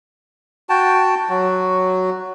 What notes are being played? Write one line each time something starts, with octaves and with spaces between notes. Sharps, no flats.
F#4 G5 A5
F#3 F#4